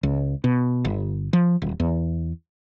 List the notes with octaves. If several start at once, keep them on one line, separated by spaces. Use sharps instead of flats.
C#2
B2
G1
F3
D#1
E2